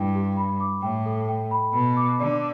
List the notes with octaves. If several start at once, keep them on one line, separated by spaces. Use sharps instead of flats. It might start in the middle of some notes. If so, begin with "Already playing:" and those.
Already playing: G2 E4 G5
G4
B5
D6
A2 G5
A4
G5
B5
B2 B5
D6
D3 D5